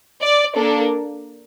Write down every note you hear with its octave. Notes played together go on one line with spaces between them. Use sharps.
D5
A#3 D4 A4